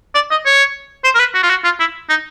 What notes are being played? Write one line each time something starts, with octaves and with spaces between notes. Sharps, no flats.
D5
D#5
C#5
C5
A#4
B4
F#4
F4
F#4
F4
E4
D#4